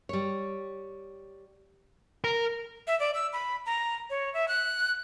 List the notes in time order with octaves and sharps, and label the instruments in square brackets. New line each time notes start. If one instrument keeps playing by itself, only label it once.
[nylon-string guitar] G3 C#5
[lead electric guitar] A#4
[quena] E5
D5
E6
B5
A#5
C#5
E5
F#6